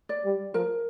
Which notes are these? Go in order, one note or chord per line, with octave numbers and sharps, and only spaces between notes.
D5
G3
F3 A#4